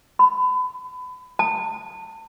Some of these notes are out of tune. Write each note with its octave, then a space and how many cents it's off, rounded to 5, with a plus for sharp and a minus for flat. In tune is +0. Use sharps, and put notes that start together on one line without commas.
B5 +30
A5 +30